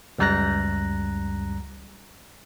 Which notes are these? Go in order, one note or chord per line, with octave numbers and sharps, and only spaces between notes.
C#2 F#2 G3 A#5 F#6 A#6